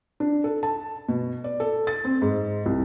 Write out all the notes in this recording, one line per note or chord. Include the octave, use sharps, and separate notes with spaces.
D4
A4
A5
B2
D5
A4
A6
C4
G#2
C2